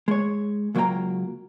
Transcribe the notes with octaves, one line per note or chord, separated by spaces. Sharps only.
G#3 C#5
C#2 F#3 A#3 C#5 G5 A#5